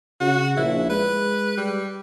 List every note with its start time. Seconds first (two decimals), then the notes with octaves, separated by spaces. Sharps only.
0.21 C#3 F#4
0.57 A#1 E4
0.90 G#3 B4
1.57 G3